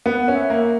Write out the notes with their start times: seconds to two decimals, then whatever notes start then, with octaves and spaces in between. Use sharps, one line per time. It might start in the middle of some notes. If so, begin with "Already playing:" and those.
0.06 B3 F#5
0.28 C#4
0.35 E5
0.50 A#3